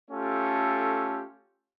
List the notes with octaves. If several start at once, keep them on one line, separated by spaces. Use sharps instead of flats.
A3 C#4 F4 G4 A4